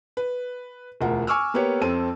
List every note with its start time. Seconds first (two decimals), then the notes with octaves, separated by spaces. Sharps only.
0.17 B4
1.01 E1 D2 F4 A#4 F#5
1.27 G#5 C#6 D6 E6 F6
1.54 A#3 B3 G4 B4 C#5
1.81 F2 C4 A4 A5 D#7